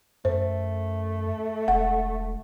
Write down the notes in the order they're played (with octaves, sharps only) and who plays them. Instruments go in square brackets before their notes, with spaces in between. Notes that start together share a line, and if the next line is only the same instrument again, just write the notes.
[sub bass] F#2 [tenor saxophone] A3 [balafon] C5
[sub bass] E1 [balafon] F#5